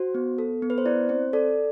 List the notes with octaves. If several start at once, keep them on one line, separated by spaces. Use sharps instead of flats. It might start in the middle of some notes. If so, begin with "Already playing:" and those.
Already playing: F#4 C5
B3
A4
B3
B4
C5
E4 D5
C4 C5
A4 D5